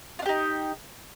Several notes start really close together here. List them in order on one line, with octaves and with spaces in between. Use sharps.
F4 D4 G4 D#4